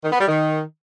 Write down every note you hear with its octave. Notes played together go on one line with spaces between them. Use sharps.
D#3
B3
G3
D#3